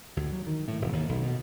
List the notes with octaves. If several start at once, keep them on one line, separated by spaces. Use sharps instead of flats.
D2
F#3
D#3
A2
E1
D#2
B1
B2